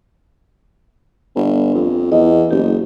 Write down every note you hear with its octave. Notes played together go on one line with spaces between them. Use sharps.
G1
F2
E2 D#5
F#1 G4